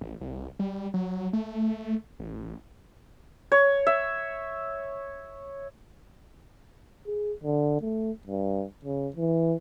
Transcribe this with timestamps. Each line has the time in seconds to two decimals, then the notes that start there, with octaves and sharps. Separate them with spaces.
0.01 A1
0.21 C2
0.59 G3
0.94 F#3
1.33 A3
2.19 A1
3.52 C#5
3.87 E5
7.06 G#4
7.43 D3
7.81 A3
8.27 G2
8.85 C#3
9.16 E3